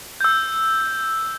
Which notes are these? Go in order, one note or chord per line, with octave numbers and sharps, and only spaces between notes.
E6 G6